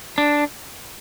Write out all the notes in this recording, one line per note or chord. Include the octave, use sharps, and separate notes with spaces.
D4